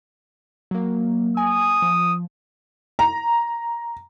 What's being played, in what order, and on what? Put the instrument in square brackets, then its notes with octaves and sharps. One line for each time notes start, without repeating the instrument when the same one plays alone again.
[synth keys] F#3 A#3
[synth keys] G#5 [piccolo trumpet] D#6
[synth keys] F3
[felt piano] A#5